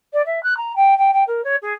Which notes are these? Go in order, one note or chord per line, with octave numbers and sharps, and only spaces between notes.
D5
E5
F#6
A#5
G5
G5
G5
A#4
C#5
G#4